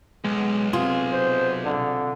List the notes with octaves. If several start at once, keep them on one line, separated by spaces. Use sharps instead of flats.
B1 G#3
C3 F4 G#4 C6
C5
D3